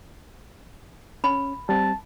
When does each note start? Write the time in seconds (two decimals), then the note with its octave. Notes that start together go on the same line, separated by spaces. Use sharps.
1.24 C#4 B5
1.69 G3 C4 A5